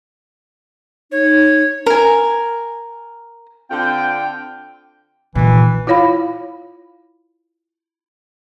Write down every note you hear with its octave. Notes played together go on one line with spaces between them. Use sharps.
D#4 C#5
A#4 G#5
D3 C4 F4 G5
A#2 D#3 E3
E4 F4 C#5 F5 B5